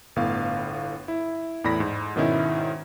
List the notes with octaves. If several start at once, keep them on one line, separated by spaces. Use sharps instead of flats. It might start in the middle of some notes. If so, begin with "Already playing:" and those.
G1 A2 B3 F5
E4
E2 A2 D5 B5 A#6
G#2
G#2 B2 D#3 C#4 D#4 E4